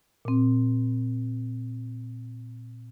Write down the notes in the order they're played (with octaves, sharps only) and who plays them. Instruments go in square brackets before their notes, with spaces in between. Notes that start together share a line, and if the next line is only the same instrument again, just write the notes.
[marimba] A#2 C4